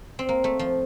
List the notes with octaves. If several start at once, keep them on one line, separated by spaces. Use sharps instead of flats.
C4
A#3
A3
F3